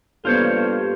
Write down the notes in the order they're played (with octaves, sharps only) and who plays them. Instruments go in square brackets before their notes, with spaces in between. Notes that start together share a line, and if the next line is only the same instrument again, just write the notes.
[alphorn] G2 [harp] A#3 B3 C#4 [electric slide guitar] F4 C5 C#5 [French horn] A4